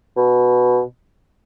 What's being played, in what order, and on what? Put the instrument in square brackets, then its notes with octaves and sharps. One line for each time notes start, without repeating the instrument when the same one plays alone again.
[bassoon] B2